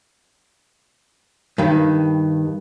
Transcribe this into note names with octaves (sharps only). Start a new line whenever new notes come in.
G2 D#3